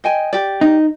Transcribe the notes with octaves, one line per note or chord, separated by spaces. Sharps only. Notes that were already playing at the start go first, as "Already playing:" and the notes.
D#5 G5 G#5
G4 D5
D#4